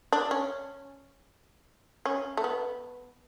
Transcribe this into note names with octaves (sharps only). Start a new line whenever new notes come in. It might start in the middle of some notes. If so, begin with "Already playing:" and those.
D4
C#4
C#4
A3
B3